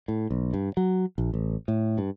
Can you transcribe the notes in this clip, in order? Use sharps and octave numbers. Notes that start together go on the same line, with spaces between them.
A2
B1
G2
F#3
A#1
A1
A2
G2